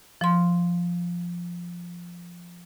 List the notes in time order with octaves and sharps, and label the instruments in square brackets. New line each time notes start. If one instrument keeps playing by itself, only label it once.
[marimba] F3 C6